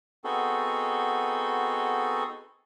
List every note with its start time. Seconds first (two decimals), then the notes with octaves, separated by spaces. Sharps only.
0.24 B3 C4 D#4 F#4 G#4 A4